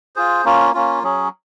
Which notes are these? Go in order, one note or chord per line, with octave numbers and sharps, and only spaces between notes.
F4 G#4 C5
A#3 C#4 F4
A#3 C#4 F4
F#3 C#4 G#4